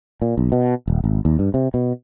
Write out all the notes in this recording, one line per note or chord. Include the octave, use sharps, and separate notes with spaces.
A#2
B1
B2
D#1
G#1
D#2
G2
C3
B2